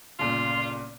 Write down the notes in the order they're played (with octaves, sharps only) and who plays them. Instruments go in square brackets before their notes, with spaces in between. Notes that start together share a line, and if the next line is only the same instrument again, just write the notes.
[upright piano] G1 A#2 C#3 [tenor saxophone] F4